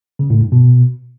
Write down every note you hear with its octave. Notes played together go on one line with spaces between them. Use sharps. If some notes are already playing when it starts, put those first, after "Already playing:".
C#3
A2
G2
B2